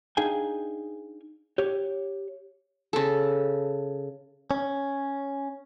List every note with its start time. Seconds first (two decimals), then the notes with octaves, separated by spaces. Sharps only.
0.17 D4 D#4 G#4 F5 G5 G#5
1.58 G4 C#5
2.93 C#3 A4
4.51 C#4